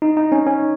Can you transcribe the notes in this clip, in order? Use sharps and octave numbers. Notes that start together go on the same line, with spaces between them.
D#4
D#4
C#4
C#4